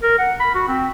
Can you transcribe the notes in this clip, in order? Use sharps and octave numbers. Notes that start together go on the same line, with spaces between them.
A#4
F#5
B5
F#4
C4